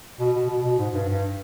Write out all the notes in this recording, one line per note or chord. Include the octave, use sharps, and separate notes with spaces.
B2
B2
B2
B2
G#2
G2
G2